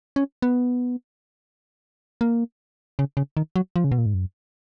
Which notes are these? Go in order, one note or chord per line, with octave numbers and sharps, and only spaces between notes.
C#4
B3
A#3
C#3
C#3
D#3
F#3
F3
C#3
B2
A#2
G#2
F#2